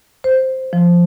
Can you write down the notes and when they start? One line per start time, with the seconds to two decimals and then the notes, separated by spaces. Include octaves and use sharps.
0.24 C5
0.73 F3